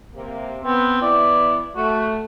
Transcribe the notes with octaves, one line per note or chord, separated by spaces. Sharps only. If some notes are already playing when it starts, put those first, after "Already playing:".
C3 A#3
B3 C4
E3 B3 E4 D5
A3 F#4